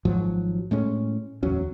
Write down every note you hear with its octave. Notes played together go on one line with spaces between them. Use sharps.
G#1 G#2 F3 F#3
A2 G#3 C#4
D1 E2 F#3 C#4